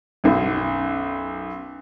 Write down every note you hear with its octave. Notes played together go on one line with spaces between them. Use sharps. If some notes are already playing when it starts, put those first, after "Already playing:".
B1 F#2